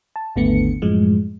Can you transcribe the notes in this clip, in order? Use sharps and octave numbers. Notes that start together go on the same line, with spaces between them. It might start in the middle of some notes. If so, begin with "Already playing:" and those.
A5
G#1 D#2 D3 A3 B3 C#7
F#2 A2 F3 G#3